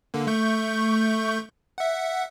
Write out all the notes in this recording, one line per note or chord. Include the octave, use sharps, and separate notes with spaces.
D3 A#3
A3 C#6 G6
E5 F#5